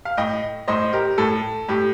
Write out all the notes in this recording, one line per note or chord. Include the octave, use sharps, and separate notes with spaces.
F5
A2 D#5 G5
A2 C5 D#5
G4 A#4
A2 A4
A2 G4